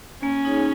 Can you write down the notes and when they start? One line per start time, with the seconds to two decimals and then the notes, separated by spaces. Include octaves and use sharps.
0.23 A#3 C#4
0.45 D#4 G#4 C#5